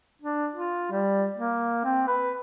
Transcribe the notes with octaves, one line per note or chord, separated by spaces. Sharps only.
D4
F4
G3
A#3
C4
B4